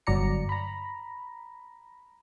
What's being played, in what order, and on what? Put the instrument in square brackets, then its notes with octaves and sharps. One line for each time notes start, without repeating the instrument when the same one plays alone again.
[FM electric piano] G1 F#3 D5 A#5 C#7
A#5 B5